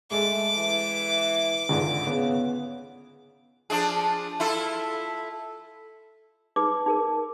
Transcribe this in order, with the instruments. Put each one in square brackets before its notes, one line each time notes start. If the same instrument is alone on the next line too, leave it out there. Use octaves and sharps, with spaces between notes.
[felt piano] G#3 A4 [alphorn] A3 [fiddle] D6
[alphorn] E3
[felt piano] G#1 C#2 D3
[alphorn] C#3 [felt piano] B3
[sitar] F3 D4 G#4
E4 F4 A4
[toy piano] D#4 G#4 B4 D6
D#4 G#4 A#4